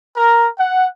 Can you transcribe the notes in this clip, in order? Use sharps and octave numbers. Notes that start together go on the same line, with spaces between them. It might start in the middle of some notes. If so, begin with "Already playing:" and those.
A#4
F#5